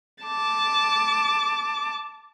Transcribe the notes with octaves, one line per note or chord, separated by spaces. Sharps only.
A5 D6